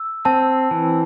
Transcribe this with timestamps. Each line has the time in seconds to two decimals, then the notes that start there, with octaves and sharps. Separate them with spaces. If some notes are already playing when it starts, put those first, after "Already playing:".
Already playing: E6
0.25 C4 A5
0.71 E3